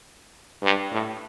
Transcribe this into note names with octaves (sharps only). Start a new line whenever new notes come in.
G2
A2